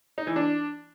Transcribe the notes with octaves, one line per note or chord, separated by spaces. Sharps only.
D#4
E3
D4